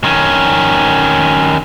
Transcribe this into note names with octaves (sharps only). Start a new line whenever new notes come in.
D#3 C#4